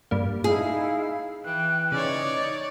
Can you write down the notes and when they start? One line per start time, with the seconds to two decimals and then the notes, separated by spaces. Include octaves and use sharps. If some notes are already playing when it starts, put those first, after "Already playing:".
0.11 G2 G3 A#3
0.44 D#4 E4 G#4 F5
1.44 E3 G5 F#6
1.92 C#3 D#4 C#5 D5